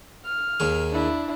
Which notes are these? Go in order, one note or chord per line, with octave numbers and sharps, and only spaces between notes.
F6
D#2 D#3 G#4
D4 E4